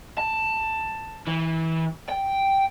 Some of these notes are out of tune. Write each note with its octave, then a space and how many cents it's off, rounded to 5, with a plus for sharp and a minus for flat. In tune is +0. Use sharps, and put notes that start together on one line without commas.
A5 +10
E3 -25
G5 -5